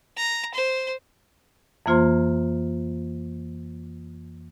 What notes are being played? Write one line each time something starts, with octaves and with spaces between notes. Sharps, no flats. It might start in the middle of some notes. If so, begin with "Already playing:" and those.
A#5
C5
F2 E3 A#3 F4 C5 C6